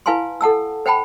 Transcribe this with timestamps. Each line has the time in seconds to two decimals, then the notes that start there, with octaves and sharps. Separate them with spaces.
0.06 E4 B4 F5 G#5 A5 C6
0.41 A4 F#5 A5 E6
0.86 C5 F#5 G5 A5 B5